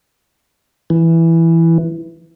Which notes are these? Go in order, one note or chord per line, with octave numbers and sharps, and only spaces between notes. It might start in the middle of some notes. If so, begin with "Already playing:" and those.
E3